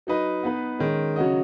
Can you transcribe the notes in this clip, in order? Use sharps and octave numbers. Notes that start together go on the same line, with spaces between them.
F#3 D#4 B4 D#5
B3 D#4 B4
D#3 G#3 C#4
C#3 F#3 C#4 F#4 D#5